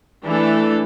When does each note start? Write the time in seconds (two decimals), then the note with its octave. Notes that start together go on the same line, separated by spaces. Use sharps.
0.24 E3 A3 D4 A4